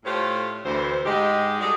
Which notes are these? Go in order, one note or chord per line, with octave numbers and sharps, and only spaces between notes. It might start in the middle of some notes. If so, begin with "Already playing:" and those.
A2 A3 F4 G4 C5 C#5
D2 E3 C5
G#2 G#3 G4
F#3 G3 G#4 A4 D5